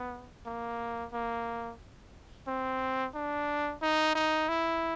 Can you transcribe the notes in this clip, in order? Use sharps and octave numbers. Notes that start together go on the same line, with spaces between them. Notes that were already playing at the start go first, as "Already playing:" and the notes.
Already playing: B3
A#3
A#3
C4
D4
D#4
D#4
E4